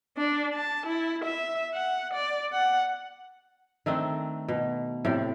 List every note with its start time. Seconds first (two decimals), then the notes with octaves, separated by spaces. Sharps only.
0.17 D4
0.55 A5
0.86 E4
1.25 E5
1.74 F#5
2.13 D5
2.53 F#5
3.86 D#3 A3 C4 D4
4.48 B2
5.05 A2 C3 D5